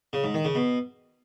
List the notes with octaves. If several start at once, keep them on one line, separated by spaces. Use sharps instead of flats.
C#3
G#2
D#3
C#3
B2